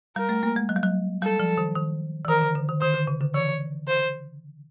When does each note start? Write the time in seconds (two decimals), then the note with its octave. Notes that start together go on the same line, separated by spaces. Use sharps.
0.16 G3 A#4
0.29 A3
0.43 A#3
0.56 G#3
0.69 F#3
0.76 G3
0.83 F#3
1.22 G3 A4
1.40 F3
1.58 D#3
1.75 D#3
2.25 E3
2.28 D#3 A#4
2.42 D3
2.55 D3
2.69 D#3
2.81 D#3 C5
2.94 D3
3.07 C#3
3.21 D3
3.34 E3 C#5
3.88 C5